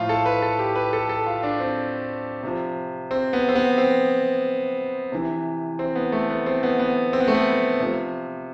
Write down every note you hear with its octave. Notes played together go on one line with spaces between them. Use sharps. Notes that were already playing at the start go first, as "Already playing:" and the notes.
Already playing: A2 F3 F4
A4
B4
A4
G4
B4
A4
A4
F4
D4
C4
C3 F3
C4
B3
C4
B3
C4
C3 E3
C4
B3
A3
B3
C4
B3
B3
C4
B3
A3
B3
C3 F3